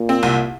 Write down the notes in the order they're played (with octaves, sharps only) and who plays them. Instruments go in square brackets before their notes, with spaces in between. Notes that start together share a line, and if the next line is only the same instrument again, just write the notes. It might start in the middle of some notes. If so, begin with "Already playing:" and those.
Already playing: [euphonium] A#2
[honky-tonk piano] C4
C2